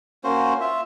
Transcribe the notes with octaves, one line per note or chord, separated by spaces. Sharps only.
A#3 C#4 F#4 C5
F4 E5